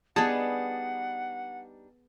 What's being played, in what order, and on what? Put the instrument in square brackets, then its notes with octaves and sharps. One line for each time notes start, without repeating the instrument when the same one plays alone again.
[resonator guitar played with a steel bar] G3 D4 D#4 [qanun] B3 G#4 [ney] F#5 [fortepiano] A5